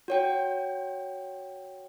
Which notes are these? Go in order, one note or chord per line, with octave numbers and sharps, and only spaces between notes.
F#4 C#5 G5